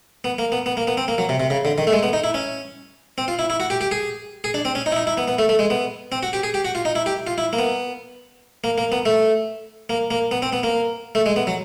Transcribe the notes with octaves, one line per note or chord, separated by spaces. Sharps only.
B3
A#3
B3
B3
A#3
B3
C4
A#3
F#3
C3
C3
C#3
D3
D#3
A3
G#3
B3
D#4
E4
C#4
C4
F4
E4
E4
F#4
G4
G4
G#4
G#4
D4
C4
C#4
D#4
E4
D#4
E4
B3
B3
A3
A3
G#3
B3
C4
F#4
G4
G#4
G4
F#4
F4
D#4
E4
G4
F4
E4
A#3
B3
A#3
A#3
B3
A3
A#3
A#3
B3
C4
B3
A#3
A3
G#3
B3
F#3